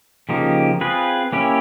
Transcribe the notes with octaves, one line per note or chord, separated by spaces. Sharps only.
C#3 F3 A#3 D#4 G4
C4 F4 G#4 B4
A#3 C#4 E4 G4